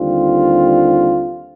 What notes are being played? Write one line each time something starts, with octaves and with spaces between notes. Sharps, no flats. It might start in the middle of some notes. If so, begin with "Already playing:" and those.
Already playing: D#2 D3 G3 C4 F4